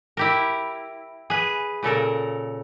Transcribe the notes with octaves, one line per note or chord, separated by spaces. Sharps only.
E4 G4 A#4
G#4 B4
A#2 C#3 A4 A#4